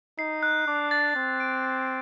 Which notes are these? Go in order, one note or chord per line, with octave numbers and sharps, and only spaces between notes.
D#4 C7
F#6
D4 D6
A6
C4 A6
D7
A6